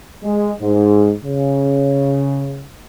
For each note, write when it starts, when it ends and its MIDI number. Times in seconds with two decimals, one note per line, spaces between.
0.24 0.53 56
0.61 1.11 44
1.23 2.65 49